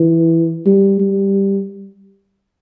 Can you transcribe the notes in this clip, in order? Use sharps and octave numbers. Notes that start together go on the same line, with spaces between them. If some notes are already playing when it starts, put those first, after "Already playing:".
Already playing: E3
G3
G3